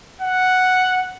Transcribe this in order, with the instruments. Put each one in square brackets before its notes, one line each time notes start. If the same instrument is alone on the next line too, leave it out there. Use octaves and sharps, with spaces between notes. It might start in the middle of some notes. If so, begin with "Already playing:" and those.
[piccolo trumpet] F#5